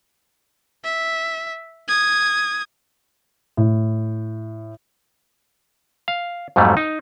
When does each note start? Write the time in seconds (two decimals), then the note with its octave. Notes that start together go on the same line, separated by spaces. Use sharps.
0.84 E5
1.88 D#6 G#6
3.57 A2
6.08 F5
6.56 F2 G#2 F#3 G3 A3
6.77 D#4